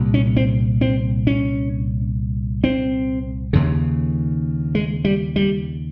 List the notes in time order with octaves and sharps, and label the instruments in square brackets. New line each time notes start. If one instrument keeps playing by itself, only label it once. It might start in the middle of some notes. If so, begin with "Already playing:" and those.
Already playing: [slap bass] C2 A#2
C#4
C4
C4
C#4
C4
D#2 C#3
G#3
G3
G3